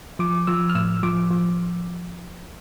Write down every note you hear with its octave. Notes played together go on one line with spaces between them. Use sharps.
F3 D6
F3 E6
F6
A2 E6
F3 D6
F3